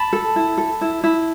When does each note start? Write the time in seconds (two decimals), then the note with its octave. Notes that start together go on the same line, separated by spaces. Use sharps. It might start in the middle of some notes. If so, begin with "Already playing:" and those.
Already playing: A5 B5
0.13 A4
0.36 E4
0.58 A4
0.81 E4
1.04 E4